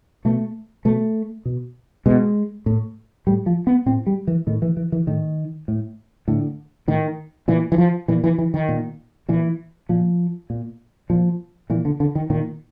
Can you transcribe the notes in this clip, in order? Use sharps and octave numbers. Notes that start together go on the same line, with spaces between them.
B2 A3
B2 A3
B2
B2 G#3
A2
A2 G3
F3
B3
A2 C4
G3
E3
A2 D#3
E3
E3
E3
A2 D#3
A2
A2 D3
A2 D#3
A#2 E3
E3
F3
A#2 E3
E3
E3
D#3
A#2
A#2 E3
A#2 F3
A#2
A#2 F3
A#2 E3
D3
D3
D#3
A#2 D#3